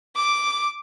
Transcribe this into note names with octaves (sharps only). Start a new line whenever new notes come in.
D6